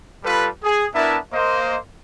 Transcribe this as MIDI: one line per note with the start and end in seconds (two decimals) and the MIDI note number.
0.24 0.48 55
0.24 0.48 65
0.24 0.48 69
0.24 0.48 71
0.63 0.86 68
0.94 1.18 59
0.94 1.18 62
0.94 1.18 64
0.94 1.18 70
0.94 1.18 76
0.94 1.18 81
1.33 1.77 58
1.33 1.77 72
1.33 1.77 75